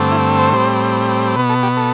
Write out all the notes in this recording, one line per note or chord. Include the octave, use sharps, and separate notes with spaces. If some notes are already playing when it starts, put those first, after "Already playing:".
Already playing: G2 D3 A3 C4
E4
C5
A2 G3 C4
B2 B3 B4
A4
G4
A4